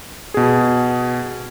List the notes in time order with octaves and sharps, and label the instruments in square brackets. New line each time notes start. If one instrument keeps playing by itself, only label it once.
[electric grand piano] B2 G#4